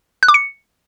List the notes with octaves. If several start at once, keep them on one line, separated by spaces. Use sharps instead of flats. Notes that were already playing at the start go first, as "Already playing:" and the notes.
F#6
D6
C#7